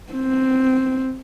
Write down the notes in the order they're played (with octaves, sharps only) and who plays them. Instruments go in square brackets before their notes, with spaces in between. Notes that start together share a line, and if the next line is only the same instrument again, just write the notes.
[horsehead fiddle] C4